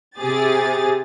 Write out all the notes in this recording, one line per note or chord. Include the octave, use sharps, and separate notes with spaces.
C3 G4 G#4 A6